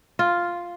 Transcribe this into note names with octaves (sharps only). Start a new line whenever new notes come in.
F4